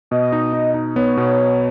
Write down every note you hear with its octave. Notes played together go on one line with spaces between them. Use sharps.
B2 D#5
D#4
D#4
D#4
B3 C#5
B2